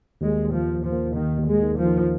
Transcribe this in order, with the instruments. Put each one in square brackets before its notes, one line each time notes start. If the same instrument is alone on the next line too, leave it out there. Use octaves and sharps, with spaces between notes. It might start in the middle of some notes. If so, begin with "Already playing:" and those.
[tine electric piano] D#2 [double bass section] G#3
[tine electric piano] D#2
[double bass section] F3
[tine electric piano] D#2
[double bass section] F3
[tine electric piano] A#3
[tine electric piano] D#2 [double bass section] D#3
[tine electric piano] D#2
[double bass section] G#3
[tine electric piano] D#3
[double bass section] F3
[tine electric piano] D#3